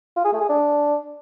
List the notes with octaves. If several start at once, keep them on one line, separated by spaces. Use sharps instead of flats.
F4
G#4
A3
G#4
D4